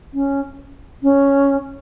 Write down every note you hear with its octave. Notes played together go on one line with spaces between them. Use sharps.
C#4
C#4